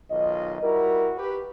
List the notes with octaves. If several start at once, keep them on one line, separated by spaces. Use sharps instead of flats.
B1 D#3 F4 D#5
G3 E4 F#4 A#4
G4 B4